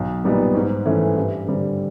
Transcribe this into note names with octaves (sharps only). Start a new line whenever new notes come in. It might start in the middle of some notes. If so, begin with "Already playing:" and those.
Already playing: B1
A#2 G3 B3 D#4
G#2
E3 A3 C#4
G2
D3 G3 C4